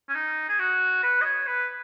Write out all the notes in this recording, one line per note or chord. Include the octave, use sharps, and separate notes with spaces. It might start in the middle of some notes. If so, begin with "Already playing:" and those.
C#4
D#4
G#4
F#4
B4
D#5
C#5
B4